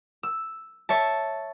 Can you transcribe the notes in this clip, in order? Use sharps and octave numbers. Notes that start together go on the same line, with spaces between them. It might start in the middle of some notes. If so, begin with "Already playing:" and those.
E6
C#5 E5 A5